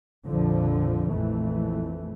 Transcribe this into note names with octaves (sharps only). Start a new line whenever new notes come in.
A#1 F2 D3 F3
A#1 F2 E3 A3